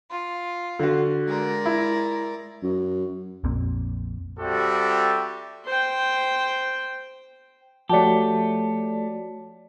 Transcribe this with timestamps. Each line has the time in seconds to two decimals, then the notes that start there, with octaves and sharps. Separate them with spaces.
0.10 F4
0.79 D3 F#4
1.28 G#3 A#4 D5
1.66 E4
2.63 F#2
3.44 A#1 F2 A#3 C4
4.39 G3 C4 F#4 G4 A4 E5
5.66 C5 G5
7.89 F3 A3 F#4 G4 C#5 D5 A5